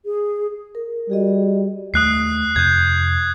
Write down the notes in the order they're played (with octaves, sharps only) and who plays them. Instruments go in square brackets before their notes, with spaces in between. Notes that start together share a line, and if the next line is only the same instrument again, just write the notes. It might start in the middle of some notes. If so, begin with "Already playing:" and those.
[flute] G#4
[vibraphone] A#4
[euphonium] G3 [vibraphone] F#4 G#4 D#5
[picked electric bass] D#2 A3 [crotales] D#6 F#6 C7
[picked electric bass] F2 C3 [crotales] G6 G#6